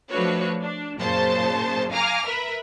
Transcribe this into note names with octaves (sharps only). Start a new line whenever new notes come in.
F3 A3 D4 F#4 B4 C#5
D4
F#2 A#2 C#3 C5 A5
F5 G#5 A#5 D6 F6
A#4 B4 E5 B5